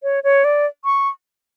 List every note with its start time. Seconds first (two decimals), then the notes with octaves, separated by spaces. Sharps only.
0.03 C#5
0.24 C#5
0.44 D5
0.85 C#6